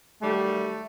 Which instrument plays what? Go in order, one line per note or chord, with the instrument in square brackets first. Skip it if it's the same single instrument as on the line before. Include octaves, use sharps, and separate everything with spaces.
[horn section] D#3 F#3 G3 [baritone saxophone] A3